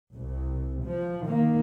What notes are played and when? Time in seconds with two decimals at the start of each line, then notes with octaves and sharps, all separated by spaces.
0.13 C2
0.84 F3
1.24 D#3 A#3